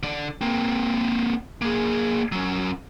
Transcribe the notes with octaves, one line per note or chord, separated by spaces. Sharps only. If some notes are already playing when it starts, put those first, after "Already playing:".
D3 D5
A#3 C4
A#3 G#4
F#3 C#4